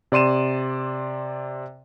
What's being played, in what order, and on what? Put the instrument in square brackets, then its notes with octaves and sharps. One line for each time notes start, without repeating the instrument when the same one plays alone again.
[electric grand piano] C3 D5 C6 D#7 E7